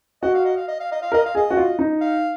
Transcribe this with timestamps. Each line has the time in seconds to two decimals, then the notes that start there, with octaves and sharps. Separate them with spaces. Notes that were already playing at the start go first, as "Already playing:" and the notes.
0.22 F#4 D#5
0.35 F5
0.45 D#5
0.57 F5
0.68 D#5
0.80 F5
0.92 D#5
1.02 F5
1.12 A#4 D#5
1.26 F5
1.35 G#4 D#5
1.51 F#4
1.57 F4
1.79 D#4
2.01 F5